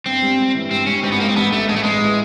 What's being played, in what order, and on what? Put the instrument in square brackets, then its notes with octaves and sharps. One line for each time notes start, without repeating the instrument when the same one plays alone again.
[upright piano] G1 [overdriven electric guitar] C4
[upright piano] G3
G2
E3
[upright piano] G2 [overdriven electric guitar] C4
[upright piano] G2 [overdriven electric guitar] C#4
[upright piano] G#1 [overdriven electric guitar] C4
[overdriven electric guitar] B3
[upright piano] G#1 [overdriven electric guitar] A#3
[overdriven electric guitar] C4
[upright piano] A1 [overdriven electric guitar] B3
[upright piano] A1 [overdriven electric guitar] A3
[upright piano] A1 [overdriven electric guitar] G#3
[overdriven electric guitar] A3
[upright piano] A1 [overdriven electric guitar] G#3
[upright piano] E3